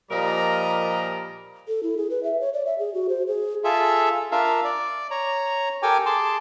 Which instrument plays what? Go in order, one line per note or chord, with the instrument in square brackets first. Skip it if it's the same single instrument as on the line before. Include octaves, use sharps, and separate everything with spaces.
[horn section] A#2 F3 G3 A#4 D#5 A#5
[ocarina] A4
E4
G#4
B4
E5
C#5
D5
E5
G#4
F#4
C5
G#4
[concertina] F4 G#4 A4 E5
D4 F4 A#4 E5 F5
D5
C#5 A#5
G4 A4 A#4 G5 G#5 D6
G#4 A5 C6 D6